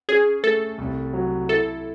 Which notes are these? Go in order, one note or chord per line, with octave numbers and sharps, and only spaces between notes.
C#4 G#4
A3 A4
C2
F#3
E4 A4